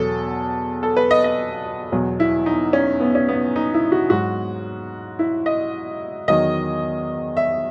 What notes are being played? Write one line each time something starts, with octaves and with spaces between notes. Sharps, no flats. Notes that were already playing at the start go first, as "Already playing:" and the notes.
Already playing: E2 B2 F#3 A4
A4
B4
D#5
D#5
E2 B2 F#3
E4
D#4
C#4
B3
C#4
B3
D#4
E4
F#4
G#2 F#3 F#4
E4
D#5
E2 D#3 F#3 D#5
E5